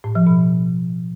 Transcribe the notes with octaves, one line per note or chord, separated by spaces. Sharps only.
A2
F3
B2